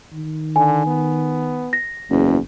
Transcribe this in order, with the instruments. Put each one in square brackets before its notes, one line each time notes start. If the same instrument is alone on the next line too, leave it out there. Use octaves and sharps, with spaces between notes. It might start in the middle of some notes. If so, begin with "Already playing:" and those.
[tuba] D#3
[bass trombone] D3 [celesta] G#5
[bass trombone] B3
[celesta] A#6
[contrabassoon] F#1 [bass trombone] E2